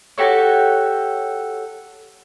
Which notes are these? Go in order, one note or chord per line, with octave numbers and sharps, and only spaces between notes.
F#4 G4 A4 C#5